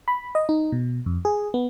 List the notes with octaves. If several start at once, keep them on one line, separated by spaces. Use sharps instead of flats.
B5
D#5
D#4
B2
F2
G#4
B3